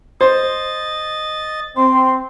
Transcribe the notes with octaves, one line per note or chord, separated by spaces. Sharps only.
C5 D#5 A6
C4 C6